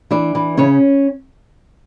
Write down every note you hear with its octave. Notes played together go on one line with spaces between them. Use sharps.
E3 D4 D5
E3
C#3 C#4 C#5